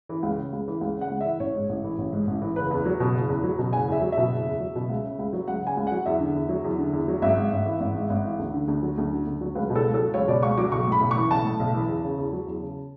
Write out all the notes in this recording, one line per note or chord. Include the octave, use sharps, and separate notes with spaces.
E3
C#2
C#3
C#2
E3
C#2
C#3
F#5
C#2
E3 E5
A1 C#5
G#2
A1
E3
A1
G#2
A1
E3
F#1 B4
E2
F#3
B2
F#1
E2
F#3
B2
F#1 G#5
E2 E5
F#3
B2 E5
F#1
E2
F#3
B2
C#2
C#3
C#2
F#3
C#2 F#5
C#3 G#5
C#2
F#3 F#5
E2 E5
D3
E2
F#3
E2
D3
E2
F#3
G#1 E5
G#2
G#1
E3
G#1
G#2
G#1
E3
D2
D3
D2
F#3
D2
D3
D2
F#3
C#2 B4
B2
A4
C#2
A4
F#3
C#2 C#5
B2 D5
C#2 C#6
F#3 D6
B1 C#6
A2
B5
B1
E3 C#6
B1 A5
A2
B1
E3
E2
C#3
E2
F#3
E2
C#3